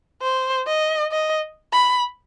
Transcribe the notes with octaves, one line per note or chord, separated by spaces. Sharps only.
C5
D#5
D#5
B5